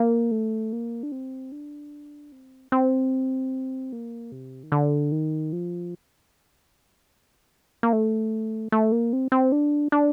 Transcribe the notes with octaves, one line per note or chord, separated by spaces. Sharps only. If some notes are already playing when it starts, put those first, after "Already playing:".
Already playing: A#3
A3
A#3
D4
C4
D4
C4
C4
A#3
C3
D#3
D3
D#3
F3
A#3
A3
A3
A#3
C4
C4
D4
D4